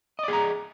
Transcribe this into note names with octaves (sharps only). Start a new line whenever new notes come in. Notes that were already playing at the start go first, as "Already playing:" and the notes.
G#4 D5 D#5 A#5